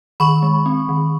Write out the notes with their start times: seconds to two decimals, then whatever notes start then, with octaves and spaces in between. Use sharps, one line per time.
0.20 D#3 B5 C#6
0.42 G#3
0.66 C4
0.89 D#3